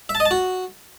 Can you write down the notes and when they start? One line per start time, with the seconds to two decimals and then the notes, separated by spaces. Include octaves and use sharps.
0.09 E5
0.15 A5
0.20 D#5
0.25 A5
0.31 F#4